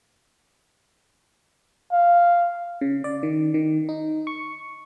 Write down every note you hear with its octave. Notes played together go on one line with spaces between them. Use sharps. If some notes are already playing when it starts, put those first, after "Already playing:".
F5
C#3
D5
D#3
D#3
D#4
C#6